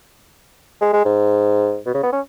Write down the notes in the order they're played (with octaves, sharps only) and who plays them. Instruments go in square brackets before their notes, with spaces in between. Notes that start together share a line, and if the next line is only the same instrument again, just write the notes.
[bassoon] G#3
G#3
G#2
B2
C#3
B3
C#4